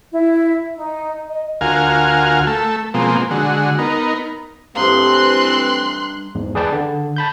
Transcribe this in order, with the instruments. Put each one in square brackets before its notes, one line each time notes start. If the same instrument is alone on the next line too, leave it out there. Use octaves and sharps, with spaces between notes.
[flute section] E4
D#4
D#5
[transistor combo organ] D2 F4 F#4 A#4 F5 G#5
A3 A4
B2 F3 G#3 A#3 C4
D3 G#3 F#4
B3 D#4 A#4
[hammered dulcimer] G2 D#4 G4 [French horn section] E3 A3 C4 [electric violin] C6 F#6
[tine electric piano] E2 G#2
G#4 B4 D5 G5 A5
D3
A5 B5 G6